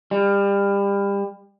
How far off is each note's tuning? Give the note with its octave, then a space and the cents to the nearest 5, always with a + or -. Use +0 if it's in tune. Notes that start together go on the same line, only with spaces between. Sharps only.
G3 +30